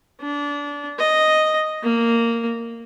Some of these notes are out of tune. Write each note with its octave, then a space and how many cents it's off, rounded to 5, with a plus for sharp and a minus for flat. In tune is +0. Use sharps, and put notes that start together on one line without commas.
D4 -25
D#5 +0
A#3 -10